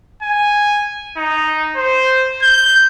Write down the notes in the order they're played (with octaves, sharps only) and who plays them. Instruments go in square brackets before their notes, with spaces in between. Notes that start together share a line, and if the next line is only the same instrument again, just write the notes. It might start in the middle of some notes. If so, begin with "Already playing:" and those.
[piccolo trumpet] G#5
D#4
C5
G6